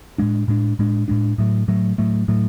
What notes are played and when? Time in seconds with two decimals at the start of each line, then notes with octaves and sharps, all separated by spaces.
0.18 A2 G#3 D4
0.48 A2 G#3 D4
0.79 A2 G#3 D4
1.08 A2 G#3 D4
1.38 A2 F#3 A3
1.68 A2 F#3 A3
1.98 A2 F#3 A3
2.28 A2 F#3 A3